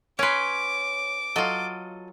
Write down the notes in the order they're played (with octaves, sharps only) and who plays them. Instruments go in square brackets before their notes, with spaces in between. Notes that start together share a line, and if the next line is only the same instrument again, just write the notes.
[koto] C#4 B4 [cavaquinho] C#5 C6 [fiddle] D6
[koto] F#3 F4 [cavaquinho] A4 D#5